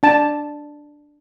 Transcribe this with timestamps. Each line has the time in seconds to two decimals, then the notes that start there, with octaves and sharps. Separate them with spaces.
0.03 D4 A5